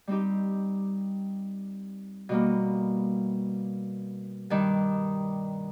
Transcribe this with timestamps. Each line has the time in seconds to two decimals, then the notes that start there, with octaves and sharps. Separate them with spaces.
0.07 G3 C4 D#4 G4
2.29 B2 G3 A#3
4.50 G2 D#3 G3